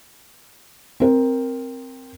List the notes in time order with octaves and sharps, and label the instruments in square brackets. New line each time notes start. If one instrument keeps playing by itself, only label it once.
[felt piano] C4 A#4